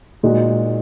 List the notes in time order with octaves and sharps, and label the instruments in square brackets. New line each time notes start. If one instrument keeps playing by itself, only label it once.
[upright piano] A#2 G#3 D#4 F#4